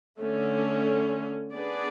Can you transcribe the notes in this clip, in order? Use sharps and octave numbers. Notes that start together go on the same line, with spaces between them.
D3 A3 C#4
B3 D4 G#4 B4 D5